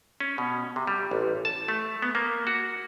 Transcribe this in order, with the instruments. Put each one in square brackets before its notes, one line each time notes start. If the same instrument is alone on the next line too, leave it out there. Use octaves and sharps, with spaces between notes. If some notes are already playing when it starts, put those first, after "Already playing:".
[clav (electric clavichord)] C#4
B2
C3
G3
A1
A5
A3
B3
A#3
F#4